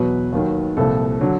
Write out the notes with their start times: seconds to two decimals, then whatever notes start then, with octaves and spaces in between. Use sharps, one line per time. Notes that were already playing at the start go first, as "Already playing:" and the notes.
Already playing: E2 B2 F#3 B4
0.32 D#2 D#3 F#3
0.77 C2 A#2 F3 A4
1.21 D3 F#3